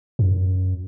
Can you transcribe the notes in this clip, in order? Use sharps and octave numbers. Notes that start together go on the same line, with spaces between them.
F#2